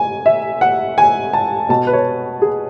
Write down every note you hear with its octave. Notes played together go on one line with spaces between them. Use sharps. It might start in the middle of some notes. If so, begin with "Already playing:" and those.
Already playing: G#5
E5
F#5
G#5
A5
B2 A5
B4
C#5
G#4